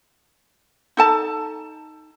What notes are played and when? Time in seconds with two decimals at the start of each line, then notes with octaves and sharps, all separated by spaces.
0.97 D#4 A4 A5